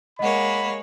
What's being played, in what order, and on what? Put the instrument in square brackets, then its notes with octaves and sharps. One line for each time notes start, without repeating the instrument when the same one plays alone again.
[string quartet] G#3 A#3 C#5 [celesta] D#5 F#5 [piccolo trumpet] B5